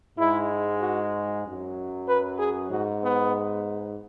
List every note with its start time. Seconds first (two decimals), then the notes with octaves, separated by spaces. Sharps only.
0.18 G#2 G#3 E4
0.81 F#4
1.46 F#2 F#3
2.08 B4
2.39 G#4
2.71 G#2 G#3 F#4
3.03 B3